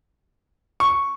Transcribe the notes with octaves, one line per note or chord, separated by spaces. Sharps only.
C#6